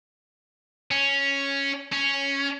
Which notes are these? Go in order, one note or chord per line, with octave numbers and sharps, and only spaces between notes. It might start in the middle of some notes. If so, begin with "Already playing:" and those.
C#4
C#4